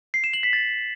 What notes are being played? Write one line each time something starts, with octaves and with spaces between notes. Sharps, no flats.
C7
E7
F#7
B6
A6